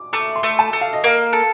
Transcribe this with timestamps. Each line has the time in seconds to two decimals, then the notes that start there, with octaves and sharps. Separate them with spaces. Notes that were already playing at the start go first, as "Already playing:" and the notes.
Already playing: D6
0.13 A3 D6
0.36 C6
0.43 A3
0.59 A5
0.73 A3
0.81 F5
0.93 D#5
1.04 A#3 F5
1.33 A4